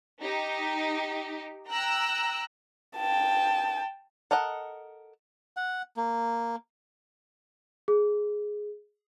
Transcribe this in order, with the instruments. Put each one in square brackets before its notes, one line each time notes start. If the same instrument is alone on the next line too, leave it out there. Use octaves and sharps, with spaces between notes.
[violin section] D#4 G4
G5 A#5 E6 F#6
[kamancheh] G5 A5
[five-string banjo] A4 A#4 D#5 F#5
[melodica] F#5
A#3
[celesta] G#4